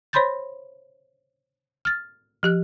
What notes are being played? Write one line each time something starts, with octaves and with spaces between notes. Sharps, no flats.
C5 C#5 B5 C6 G6 A6
F6 A6
F3 G4 F#6